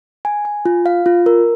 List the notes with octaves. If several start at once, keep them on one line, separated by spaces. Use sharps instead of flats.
G#5
G#5
F4
F5
F4
A#4